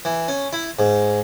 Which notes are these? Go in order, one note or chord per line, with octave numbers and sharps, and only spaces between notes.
E3
C#4
E4
G#2